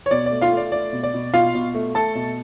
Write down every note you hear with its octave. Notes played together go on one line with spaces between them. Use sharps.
C#5
B2 D5
D5
A3
F4 F5
A3 D5
A3 D5
B2
D5
B2
B2 F4 F5
B2
A3
A3 A4 A5
B2